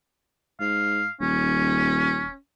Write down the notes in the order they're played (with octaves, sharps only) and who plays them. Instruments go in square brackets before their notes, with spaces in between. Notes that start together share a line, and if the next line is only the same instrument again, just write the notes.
[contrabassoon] G#2 [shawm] F5
[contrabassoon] D#1 [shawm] C#4